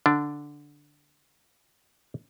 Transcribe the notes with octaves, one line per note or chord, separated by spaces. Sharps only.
D3 D4